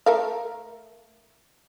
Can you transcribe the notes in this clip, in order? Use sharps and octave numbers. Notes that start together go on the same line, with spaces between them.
A3 A#4 F5